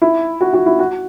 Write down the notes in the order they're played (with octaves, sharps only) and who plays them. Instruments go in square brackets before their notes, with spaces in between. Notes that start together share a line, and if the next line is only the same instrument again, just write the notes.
[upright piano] E4
F#4
F#4
E4
F#4